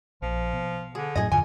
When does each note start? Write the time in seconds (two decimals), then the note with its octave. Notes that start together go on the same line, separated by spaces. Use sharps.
0.22 A#1 F3
0.53 B2
0.95 D3 G#4
1.16 F#2 A2 F#3 G#4 D#5
1.32 E2 G2 A#2 D3 G#5